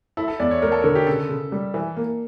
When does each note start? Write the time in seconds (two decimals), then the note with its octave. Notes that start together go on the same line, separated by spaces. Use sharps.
0.17 E4 A4
0.28 A4
0.40 E2 D5
0.51 C#5
0.62 A3 A#4
0.72 A4
0.82 D3 A#4
0.95 G4
1.07 C#3 A4
1.29 C#3
1.52 G3
1.74 E3
1.96 A#3